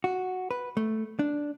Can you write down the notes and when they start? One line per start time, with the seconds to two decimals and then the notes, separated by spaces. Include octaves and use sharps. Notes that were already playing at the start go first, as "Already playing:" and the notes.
0.04 F#4
0.51 B4
0.77 A3
1.19 D4